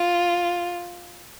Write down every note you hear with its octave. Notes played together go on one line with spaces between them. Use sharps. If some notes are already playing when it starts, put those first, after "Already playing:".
Already playing: F4